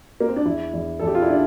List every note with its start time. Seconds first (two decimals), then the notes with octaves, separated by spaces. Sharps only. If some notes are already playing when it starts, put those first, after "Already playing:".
0.20 A#3
0.29 C4
0.36 D4
0.45 E2 E4
0.73 E2
0.99 E2 A4
1.07 G4
1.15 F4
1.22 E4
1.30 D4